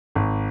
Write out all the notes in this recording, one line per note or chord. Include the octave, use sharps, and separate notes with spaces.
G#1